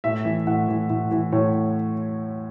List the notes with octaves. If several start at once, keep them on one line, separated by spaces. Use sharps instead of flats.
A2 E5
E3
A2 F#5
E3
A2
E3
A2 C#5